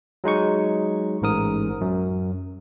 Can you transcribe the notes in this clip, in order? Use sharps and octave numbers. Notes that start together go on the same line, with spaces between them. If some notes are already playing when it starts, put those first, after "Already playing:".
F#3 G#3 D#4 C#6
A1 G#2 A#4 D#6
F#2